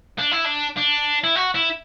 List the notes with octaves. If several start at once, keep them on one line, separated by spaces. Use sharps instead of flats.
D4
E4
D4
D4
E4
F#4
E4